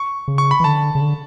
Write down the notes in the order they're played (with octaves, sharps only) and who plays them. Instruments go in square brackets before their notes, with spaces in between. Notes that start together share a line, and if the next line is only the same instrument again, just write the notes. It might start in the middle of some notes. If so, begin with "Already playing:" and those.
Already playing: [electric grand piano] C#6
[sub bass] C#3
[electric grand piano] C#6
B5
[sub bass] E3
[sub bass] D3 [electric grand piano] A5
[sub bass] C#3
D3